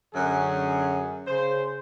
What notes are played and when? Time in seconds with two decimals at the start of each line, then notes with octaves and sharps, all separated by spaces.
0.13 F#2 D3 F#3 C#4 G#4
1.27 C#3 C5